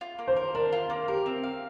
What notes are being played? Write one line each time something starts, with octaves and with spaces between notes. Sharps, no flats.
F4
A#3
C5
A#4
D4 A#4
F4
A#3
G4 A#4
C4
F5